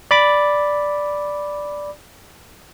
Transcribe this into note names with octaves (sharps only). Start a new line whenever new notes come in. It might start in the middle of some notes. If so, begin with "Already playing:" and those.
D5 B5 D6